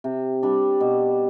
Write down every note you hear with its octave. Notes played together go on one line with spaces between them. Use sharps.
C3
G3 D4
B2